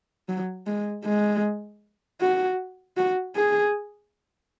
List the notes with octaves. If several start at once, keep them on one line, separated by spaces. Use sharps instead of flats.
F#3
G#3
G#3
F#4
F#4
G#4